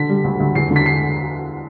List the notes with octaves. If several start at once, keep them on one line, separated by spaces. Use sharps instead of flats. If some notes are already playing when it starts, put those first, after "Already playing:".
Already playing: D3 B6
G3
D2
D2
E2 C7
D3
B6
C7